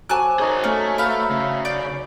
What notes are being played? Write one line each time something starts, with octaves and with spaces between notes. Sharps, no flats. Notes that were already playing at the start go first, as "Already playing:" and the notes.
F#3 C5 G#5 A5 D6 F#6
D#4 G#4 A#4 C#5
A3 C#4
B4 E5 F5
C#3
D5 D6 G6